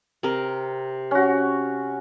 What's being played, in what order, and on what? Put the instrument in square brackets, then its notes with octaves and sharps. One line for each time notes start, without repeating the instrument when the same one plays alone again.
[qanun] C3 A#4
[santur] C#4 F#4